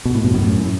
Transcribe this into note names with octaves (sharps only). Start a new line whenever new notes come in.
B2
A2
G2 B2
F#2 A2
A2